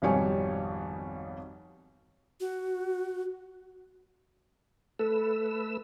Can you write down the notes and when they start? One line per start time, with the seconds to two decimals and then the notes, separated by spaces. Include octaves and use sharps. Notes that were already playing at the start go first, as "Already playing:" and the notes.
0.02 G#1 F2 B2 G3 C#5 G#5
2.40 F#4
4.99 A3 A4 B4 E6